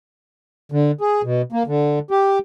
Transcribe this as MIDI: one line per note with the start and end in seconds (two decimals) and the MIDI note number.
0.72 0.91 50
1.01 1.22 68
1.23 1.42 47
1.52 1.63 58
1.67 1.99 50
2.11 2.39 67